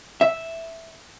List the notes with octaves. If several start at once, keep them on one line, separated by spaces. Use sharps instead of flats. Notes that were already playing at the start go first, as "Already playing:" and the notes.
E5